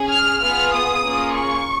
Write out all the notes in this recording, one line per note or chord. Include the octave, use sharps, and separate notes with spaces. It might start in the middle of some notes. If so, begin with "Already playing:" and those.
Already playing: C#4 G#4
F6
B3 F4 G#4 F6
D#6
A#3 C#4 F4 G#4
C#6